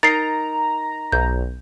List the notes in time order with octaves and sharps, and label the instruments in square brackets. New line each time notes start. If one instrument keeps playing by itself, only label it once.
[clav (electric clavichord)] D#4 A#4 D#5 [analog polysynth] A#5 [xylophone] A6 C7
[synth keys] B1 [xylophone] G6